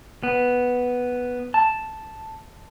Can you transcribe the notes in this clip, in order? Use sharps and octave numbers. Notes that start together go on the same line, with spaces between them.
B3
A5